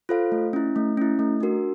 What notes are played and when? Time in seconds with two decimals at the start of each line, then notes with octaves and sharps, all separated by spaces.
0.09 F4 A4 C5 F5
0.32 A3
0.53 C#4 E4
0.76 A3
0.97 C#4 E4
1.19 A3
1.41 D4 F#4 A#4